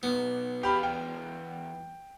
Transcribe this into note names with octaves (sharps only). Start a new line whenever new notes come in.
B1 B3
E2 G4 F5 B5
G5